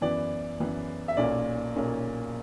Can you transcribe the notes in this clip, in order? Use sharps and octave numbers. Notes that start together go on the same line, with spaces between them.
F#2 E3 B3 D5
F#2 E3 B3
E5
B1 A#2 A#3 C#4 D5
B1 A#2 A#3 C#4